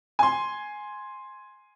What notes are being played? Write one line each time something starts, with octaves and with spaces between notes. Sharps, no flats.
G#5 C6